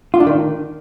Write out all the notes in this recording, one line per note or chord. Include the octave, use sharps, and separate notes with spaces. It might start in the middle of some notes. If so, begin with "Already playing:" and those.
F4
D4
D#3